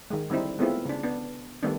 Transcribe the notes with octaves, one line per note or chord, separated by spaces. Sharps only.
D#3 G#3
D3 G3 C4 D#4 E4
G#3 A3 B3 C4 E4 F4
C#3 D4
B3 D4
D#3 G3 A3 B3 D4